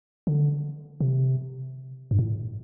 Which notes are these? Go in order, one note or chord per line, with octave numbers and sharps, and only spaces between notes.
D3
C3
G2
A2